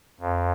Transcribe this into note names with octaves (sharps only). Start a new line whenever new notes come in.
F2